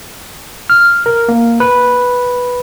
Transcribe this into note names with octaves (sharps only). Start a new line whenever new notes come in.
F6
A#4
A#3
B4